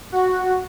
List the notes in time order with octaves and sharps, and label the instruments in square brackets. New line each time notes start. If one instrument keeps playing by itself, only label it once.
[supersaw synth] F#4